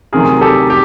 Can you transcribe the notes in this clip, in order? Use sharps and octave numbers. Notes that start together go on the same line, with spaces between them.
D2 C3 D#3 F#3 G#4 A#4
G4 A4
G4